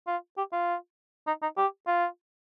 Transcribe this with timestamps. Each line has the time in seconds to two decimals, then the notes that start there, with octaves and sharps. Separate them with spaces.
0.07 F4
0.38 G4
0.53 F4
1.27 D#4
1.42 D#4
1.57 G4
1.87 F4